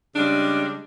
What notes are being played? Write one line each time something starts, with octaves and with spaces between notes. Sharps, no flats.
C#3 G3 G#3 D4